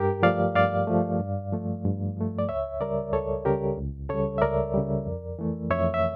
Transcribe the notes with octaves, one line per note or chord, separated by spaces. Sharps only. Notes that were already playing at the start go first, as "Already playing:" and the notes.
Already playing: G2 G4 A#4
F3 A3 D5 F5
G2 D5 F5
F3 A3
G2
F3 A3
G2
F3 A3
D5
C#2 C#5 E5
C#3 G3 A#4 D5
C#2 A4 C#5
C#3 G3 G4 A#4
C#2
C#3 G3 A4 C#5
E5
C#2 A#4 D5
C#3 G3
F2
E3 A3
F2 C#5 E5
E5